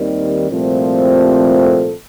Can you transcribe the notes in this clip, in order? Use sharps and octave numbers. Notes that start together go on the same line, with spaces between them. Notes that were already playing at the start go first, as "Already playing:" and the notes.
Already playing: D#2 D#3 G3 C4
C2 A#2 F3 A3 C4
G4
A4